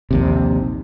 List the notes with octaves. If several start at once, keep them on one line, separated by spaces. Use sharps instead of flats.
A#1 D#2 C3